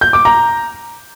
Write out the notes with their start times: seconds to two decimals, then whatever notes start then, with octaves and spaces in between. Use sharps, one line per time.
0.01 G6
0.13 D6
0.25 A#5